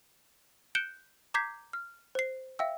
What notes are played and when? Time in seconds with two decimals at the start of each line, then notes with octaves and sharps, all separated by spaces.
0.75 F#6 G6 C#7 D7 E7 G7
1.34 A#5 D6 G6 G#6 B6 C7
1.73 F6
2.15 C5 C7
2.59 E5 F5 G5 E6